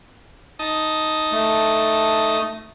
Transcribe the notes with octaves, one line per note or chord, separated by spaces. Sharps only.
D#4 D#5 A5
A3